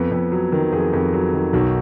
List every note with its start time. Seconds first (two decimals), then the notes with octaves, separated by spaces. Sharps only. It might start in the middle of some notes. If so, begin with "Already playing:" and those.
Already playing: F2 B3
0.11 F2
0.32 F#3
0.52 D#3
0.72 F2 G#4
0.93 F2
1.13 F#3
1.34 D#3
1.53 B1 F#4